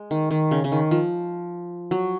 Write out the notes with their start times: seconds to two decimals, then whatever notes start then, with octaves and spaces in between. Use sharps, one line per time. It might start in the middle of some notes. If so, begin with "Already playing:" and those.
Already playing: G#3
0.11 D#3
0.31 D#3
0.51 C#3
0.64 C#3
0.72 D#3
0.91 F3
1.91 F#3